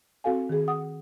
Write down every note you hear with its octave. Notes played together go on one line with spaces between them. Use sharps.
C4 F#4 A4 F5 G#5
D#3 G#4
F#5 D#6